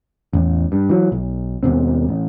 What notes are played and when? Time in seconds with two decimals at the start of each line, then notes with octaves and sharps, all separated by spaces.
0.33 A1 E2
0.72 G2
0.89 E3 F#3
1.12 B1
1.63 D#2 B2 C4
2.09 A1